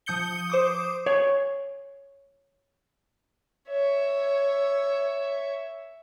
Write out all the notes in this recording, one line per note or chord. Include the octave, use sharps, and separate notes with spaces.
F3 D#6 G6 C#7 G7
C5 D6 D#6
C#5
C#5 E5